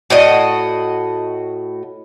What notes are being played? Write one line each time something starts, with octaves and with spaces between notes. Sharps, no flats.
A2 F#4 D#5